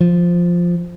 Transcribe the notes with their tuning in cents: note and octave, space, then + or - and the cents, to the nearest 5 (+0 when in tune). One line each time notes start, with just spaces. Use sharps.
F3 +0